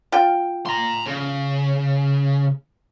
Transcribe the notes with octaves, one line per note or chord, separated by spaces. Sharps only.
F4 G5
A#5 C6
C#3